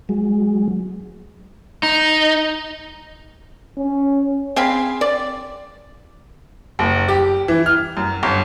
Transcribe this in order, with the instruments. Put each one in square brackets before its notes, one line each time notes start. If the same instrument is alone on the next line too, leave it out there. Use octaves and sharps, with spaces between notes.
[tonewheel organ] F#3 G#3
[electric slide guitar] D#4
[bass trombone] C#4
[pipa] C4 G#4 F5 B5
D5
[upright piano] F#1
G4
E3
F6
F#2
G1